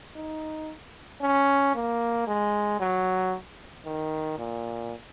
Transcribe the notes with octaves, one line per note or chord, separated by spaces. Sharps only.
D#4
C#4
A#3
G#3
F#3
D#3
A#2